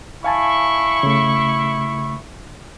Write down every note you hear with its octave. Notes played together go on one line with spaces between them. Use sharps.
E4 F5 G#5 A5 C#6
C#3 A3